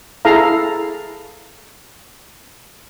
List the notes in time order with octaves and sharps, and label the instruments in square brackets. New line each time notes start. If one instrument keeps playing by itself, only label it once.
[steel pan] E4 G#4 A4 F5 A#5